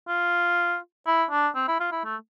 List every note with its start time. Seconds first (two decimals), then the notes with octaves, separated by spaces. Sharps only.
0.08 F4
1.07 E4
1.31 D4
1.55 C4
1.68 E4
1.80 F4
1.92 E4
2.04 A3